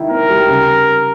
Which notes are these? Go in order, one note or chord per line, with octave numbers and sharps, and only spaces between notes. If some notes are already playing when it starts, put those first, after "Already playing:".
Already playing: D#3 E4
C4 A#4
G3
C#3